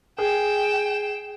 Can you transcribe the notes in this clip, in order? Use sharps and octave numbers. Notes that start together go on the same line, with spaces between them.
G#4 G5 E7